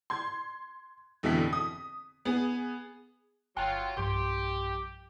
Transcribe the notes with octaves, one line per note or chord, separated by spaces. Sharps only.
C6 G#6
F1 B2 D3 E3 E4 B6
D#6
B3 G#4
G1 F#3 F4 G5 C6 F#6
B1 G2 F3 G4 C6